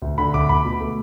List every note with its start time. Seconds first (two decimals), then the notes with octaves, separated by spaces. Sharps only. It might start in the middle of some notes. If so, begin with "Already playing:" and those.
0.02 D2
0.18 D3 B5
0.34 D2 D6
0.49 D2 B5
0.65 B2
0.81 A3